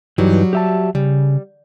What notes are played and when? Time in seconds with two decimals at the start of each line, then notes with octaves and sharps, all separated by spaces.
0.18 G2 E3 F#3 G3 D#4
0.53 G4 E5 A5
0.95 C#3 G3